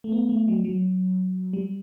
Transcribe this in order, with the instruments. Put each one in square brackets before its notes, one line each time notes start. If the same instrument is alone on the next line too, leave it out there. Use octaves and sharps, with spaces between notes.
[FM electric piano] A3
B3
A3
F#3
F#3
G3